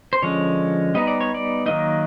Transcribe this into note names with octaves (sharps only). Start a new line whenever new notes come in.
C5
D3 F3 G#3 C#4 C#5
G3 B3 D#4 D#5
D5
C#5
D5
D#3 F#3 A#3 D#4 D#5